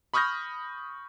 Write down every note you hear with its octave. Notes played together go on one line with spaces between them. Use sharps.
B5 C#6 D#6 F6 G6 A#6